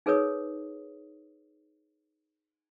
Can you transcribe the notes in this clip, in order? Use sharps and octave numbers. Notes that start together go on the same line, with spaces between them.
D#4 G#4 A#4 B4 C#5 D#6